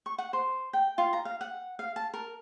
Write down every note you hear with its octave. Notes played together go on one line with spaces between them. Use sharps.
C#6
F#5
C5
G5
F4
A#5
F5
F#5
F5
A5
A#4